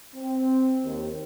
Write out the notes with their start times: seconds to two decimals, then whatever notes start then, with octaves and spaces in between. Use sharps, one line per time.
0.15 C4
0.85 D#2